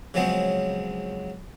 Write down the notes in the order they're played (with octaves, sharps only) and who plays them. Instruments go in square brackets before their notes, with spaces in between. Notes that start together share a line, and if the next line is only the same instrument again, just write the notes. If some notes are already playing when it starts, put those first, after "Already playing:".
[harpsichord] C#3 F3 F#3 G#3 B3 C4